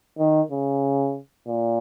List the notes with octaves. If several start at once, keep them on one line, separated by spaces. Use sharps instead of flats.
D#3
C#3
A#2